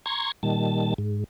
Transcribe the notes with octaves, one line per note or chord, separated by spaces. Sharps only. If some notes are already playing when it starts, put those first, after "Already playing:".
A#5 C6 C#6 G#6
A#2 D#3 G3 A5
G#2